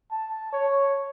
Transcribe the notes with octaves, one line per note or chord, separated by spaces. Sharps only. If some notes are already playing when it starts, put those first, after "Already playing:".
A5
C#5